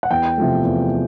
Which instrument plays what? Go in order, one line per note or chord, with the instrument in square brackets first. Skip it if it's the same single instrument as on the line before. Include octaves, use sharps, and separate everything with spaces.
[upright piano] F#5
E2 G5
C3 F3 A3
E2